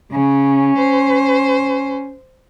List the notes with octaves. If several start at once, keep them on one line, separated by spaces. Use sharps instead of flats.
C#3 C#4
C5